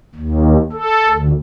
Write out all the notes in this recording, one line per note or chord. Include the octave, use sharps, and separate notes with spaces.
D#2
A4
D2